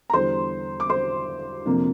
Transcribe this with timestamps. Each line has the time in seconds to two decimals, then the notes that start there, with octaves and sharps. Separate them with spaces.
0.10 A#5
0.13 E2 D3 G3 C5 C6
0.80 D6
0.90 C5 C6
1.65 F2 C3 F3 A#3 D4